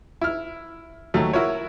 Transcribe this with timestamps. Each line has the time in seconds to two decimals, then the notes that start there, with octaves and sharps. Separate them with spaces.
0.21 E4 F6
1.14 D#2 F#3 A3
1.33 E4 F#4 A#4 C#5